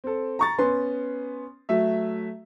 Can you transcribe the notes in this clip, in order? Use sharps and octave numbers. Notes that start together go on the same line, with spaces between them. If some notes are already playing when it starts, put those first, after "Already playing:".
C4 A4
A#5 C#6 A6
B3 C#4 B4 C6
F#3 A3 E5